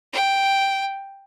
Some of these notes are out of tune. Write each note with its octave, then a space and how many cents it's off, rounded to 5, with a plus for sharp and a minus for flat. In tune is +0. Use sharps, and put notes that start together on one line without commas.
G5 +0